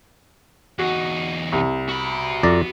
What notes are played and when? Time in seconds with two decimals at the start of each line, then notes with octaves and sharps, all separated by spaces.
0.79 E2 D#4 F#4
1.52 C2
1.89 F#4 B5
2.43 F2 D5 A#5